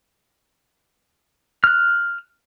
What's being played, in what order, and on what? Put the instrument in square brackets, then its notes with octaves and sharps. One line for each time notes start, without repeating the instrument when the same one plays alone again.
[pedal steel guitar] F6 F#6